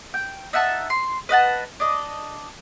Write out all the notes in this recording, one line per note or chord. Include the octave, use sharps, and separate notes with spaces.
G5
D#4 E5 F#5 A5
C6
B4 D#5 F#5 A5
D4 D#5